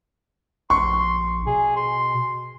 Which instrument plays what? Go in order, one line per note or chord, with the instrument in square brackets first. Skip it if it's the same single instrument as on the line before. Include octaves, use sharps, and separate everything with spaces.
[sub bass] A#1 [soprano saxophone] C6 [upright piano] C#6
[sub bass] B2 [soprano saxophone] G#4
[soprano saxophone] C6